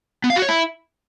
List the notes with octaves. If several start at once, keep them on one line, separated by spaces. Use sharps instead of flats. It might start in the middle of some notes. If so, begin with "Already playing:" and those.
B3
F5
F#4
C#5
E4